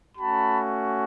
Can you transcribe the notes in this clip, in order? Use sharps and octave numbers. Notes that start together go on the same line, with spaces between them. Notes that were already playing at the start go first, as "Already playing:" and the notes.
A3 C#4 F#4 A5 B5